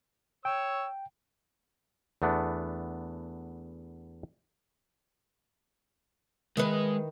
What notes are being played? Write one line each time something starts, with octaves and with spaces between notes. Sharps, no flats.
C#5 G5 E6
E2 A3 B3 D4
D#3 G#3 E4 B4